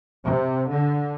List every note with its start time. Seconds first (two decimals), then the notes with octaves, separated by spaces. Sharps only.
0.24 C3
0.69 D3